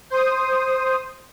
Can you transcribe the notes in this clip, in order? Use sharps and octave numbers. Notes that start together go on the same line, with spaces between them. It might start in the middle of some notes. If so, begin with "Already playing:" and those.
C5 D#6